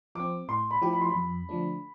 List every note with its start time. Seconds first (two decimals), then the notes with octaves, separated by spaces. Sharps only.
0.15 F3 C4 D6
0.48 A2 C6
0.71 B5
0.82 F3 A3 E4 G4
0.93 B5
1.01 C6
1.09 B5
1.15 F2
1.49 D3 F3 A3 D4